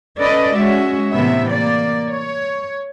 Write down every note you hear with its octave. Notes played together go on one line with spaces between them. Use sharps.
C#4 A4 B4 D5 D#5
G#3 C#4 F#4 E5
A2 C3 E3 B3 E5
A#3 D5
C#5